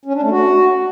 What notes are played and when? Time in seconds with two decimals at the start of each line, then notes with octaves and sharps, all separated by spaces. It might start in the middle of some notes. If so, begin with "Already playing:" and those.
0.05 C#4
0.14 D4
0.22 A3
0.30 F#4